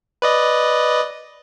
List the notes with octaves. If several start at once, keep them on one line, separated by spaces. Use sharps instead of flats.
B4 D5 D#5